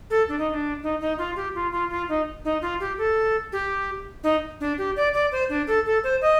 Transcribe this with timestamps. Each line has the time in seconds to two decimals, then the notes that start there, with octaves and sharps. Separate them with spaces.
0.10 A4
0.29 D4
0.39 D#4
0.50 D#4
0.54 D4
0.83 D#4
1.01 D#4
1.18 F4
1.36 G4
1.55 F4
1.72 F4
1.90 F4
2.09 D#4
2.45 D#4
2.62 F4
2.80 G4
2.98 A4
3.52 G4
4.23 D#4
4.61 D4
4.78 G4
4.96 D5
5.14 D5
5.32 C5
5.49 D4
5.67 A4
5.86 A4
6.04 C5
6.22 D#5